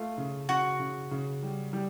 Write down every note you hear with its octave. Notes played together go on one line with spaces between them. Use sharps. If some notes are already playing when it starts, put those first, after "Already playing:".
Already playing: A3 F4
C#3
C#3 F#4
C#3
C#3
G3
G3